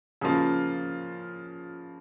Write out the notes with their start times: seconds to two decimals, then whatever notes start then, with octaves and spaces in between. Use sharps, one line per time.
0.21 C#3 F3 A#3 F4